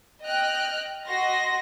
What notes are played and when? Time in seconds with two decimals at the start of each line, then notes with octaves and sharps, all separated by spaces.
0.23 D#5 G5 F6 F#6
1.06 F#4 D#5 C6 A#6